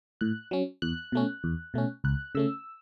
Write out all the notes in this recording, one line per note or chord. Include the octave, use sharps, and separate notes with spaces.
A2 F#6
F#3 C#4
E2 F#6
B2 A3 C#4
E2
B2 A3 C#4
C#2 F#6
C#3 A3 C#4 E6